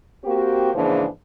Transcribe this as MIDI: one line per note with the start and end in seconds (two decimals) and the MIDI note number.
0.24 0.73 58
0.24 0.73 60
0.24 0.73 66
0.24 0.73 67
0.75 1.06 44
0.75 1.06 49
0.75 1.06 52
0.75 1.06 53
0.75 1.06 58
0.75 1.06 62